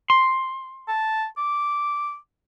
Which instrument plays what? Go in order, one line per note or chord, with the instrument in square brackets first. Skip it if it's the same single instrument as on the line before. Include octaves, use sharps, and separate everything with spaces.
[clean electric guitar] C6
[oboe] A5
D6